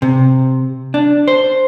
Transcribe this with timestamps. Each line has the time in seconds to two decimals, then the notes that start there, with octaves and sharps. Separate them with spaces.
0.02 C3
0.94 D4
1.28 C5